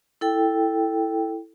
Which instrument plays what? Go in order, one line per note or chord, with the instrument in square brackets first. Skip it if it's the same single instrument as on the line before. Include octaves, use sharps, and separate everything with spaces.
[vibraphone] E4 A4 G5